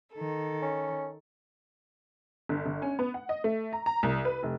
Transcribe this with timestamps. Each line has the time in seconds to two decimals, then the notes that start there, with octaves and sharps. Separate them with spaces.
0.15 D#3 A4
0.62 C#4
2.49 G1
2.66 G1
2.82 C#4
2.99 B3
3.14 F#5
3.29 D#5
3.44 A3
3.73 A#5
3.86 A#5
4.03 C2
4.25 B4
4.43 F1